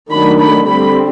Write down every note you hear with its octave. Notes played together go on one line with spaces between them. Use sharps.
D#3 F#3 A3 D4 B5
B5
D3 G3 C4 B5